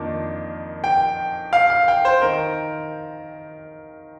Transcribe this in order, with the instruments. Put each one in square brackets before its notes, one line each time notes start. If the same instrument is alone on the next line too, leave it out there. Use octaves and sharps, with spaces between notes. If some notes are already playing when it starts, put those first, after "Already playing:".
Already playing: [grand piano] F2 D#3 A#3 D4
G5
F5
F5
G5
C5
D#3 A#4